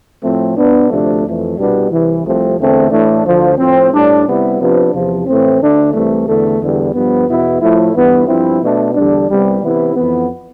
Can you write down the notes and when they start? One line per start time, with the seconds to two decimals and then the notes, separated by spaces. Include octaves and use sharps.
0.23 A2 F3 A3 C4
0.56 B2 B3 D4
0.90 D2 C3 F3 A3 D4
1.24 F2 E3 A3
1.57 C2 B2 G3 B3 D4
1.90 C2 C3 E3
2.24 C2 C3 F3 A3 C4
2.57 E2 D3 A3 C4
2.91 A2 E3 A3 D4
3.24 D2 D3 F3
3.58 A2 F3 C4
3.92 A2 G3 D4
4.25 C3 G3 B3 E4
4.59 C3 F3 B3 D4
4.92 E2 C3 F3
5.26 A2 E3 A3 C4
5.60 D2 D3 A3 D4
5.93 C2 C3 E3 A3
6.26 E2 D3 A3
6.60 E2 D3 G3
6.93 G2 F3 B3
7.26 E2 B2 B3 E4
7.61 A2 F3 A3 E4
7.94 G2 E3 B3
8.27 G2 F3 C4 E4
8.61 B2 A3 D4
8.94 E2 D3 G3 D4
9.27 C2 C3 G3 B3
9.62 C3 E3 B3 E4
9.95 F2 E3 B3